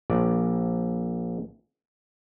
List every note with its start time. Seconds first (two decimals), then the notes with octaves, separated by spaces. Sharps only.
0.10 A#1 D5